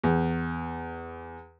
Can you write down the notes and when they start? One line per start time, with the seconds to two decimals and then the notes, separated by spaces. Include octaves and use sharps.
0.04 E2